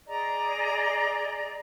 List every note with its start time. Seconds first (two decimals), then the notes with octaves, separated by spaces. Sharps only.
0.07 G#4 D5 D#5 A#5